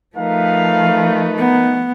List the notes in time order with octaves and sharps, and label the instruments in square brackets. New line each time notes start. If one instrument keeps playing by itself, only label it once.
[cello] F3 A3 [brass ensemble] D#4 A#4 B4 [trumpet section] F5
[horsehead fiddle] B3